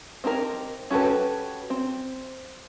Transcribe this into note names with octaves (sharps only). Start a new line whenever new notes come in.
C4 D#4 G4 A#4
C#4 F#4 G4 A4 B4
C4